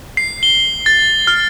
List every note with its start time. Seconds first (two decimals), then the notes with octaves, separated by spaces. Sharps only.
0.17 C7
0.43 G7
0.86 A6
1.27 F6